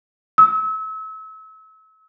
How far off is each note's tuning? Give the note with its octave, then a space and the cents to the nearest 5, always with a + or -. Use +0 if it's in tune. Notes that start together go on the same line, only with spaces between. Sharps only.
E6 -35